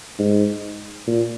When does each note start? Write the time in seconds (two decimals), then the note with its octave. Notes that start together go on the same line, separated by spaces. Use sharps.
0.19 G#2
1.07 A#2